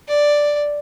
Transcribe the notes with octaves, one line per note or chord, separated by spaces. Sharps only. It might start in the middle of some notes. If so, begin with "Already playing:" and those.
D5